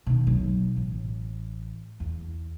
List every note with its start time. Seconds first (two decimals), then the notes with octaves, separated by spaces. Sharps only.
0.07 B2 D#3
0.27 B1 F#3
0.76 A1
2.00 E2